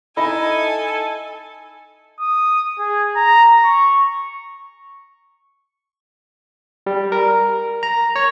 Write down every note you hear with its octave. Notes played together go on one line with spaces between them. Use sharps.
D#4 E4 A4 D#5 G#5 B5
D#6
G#4
A#5
C#6
G3
A#4
A#5
C#5